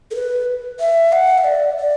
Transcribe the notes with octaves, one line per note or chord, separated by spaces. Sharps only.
A4
B4
E5
F#5
E5
D5
D5